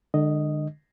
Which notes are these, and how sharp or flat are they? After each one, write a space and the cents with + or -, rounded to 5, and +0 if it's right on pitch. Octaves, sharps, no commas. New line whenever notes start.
D3 +35 G#3 +0 D#5 +0